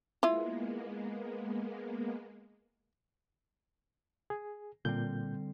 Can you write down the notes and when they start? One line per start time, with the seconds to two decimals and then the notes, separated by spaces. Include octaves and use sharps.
0.23 G#3 A#3 B3 E4 F4
4.30 G#4
4.85 A#2 D3 G3 C4 G6